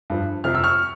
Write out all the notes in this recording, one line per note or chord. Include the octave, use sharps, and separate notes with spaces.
G2 F3
F2 C3 F3 F6
E6
C#6 F6